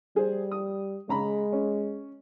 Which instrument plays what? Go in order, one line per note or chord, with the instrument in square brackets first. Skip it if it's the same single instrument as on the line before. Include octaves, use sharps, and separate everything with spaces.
[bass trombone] G3 [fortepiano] G#4 C5
[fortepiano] D#6
[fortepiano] C#3 A#5 B5 [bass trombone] G#3
[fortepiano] C#4